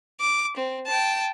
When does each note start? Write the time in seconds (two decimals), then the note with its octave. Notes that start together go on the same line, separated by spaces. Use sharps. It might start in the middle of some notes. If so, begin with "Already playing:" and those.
0.20 D6
0.57 C4
0.87 G5 A5